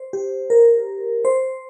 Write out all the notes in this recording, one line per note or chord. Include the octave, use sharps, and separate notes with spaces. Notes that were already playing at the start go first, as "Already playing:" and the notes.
Already playing: C5
G4
A#4
C5